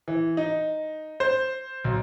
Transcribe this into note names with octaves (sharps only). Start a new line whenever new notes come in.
E3
D#4
C5
B1